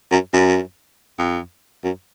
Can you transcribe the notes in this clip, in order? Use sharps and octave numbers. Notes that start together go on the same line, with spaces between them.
F#2
F#2
F2
F#2